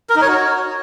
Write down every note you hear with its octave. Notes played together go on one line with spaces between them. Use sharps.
A#4
D#4
C#5
F#4